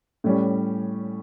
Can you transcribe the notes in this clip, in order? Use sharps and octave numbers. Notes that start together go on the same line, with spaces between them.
A2 G3 C#4